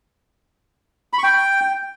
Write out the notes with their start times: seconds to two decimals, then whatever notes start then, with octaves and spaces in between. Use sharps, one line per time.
1.13 B5
1.18 C#6
1.23 G5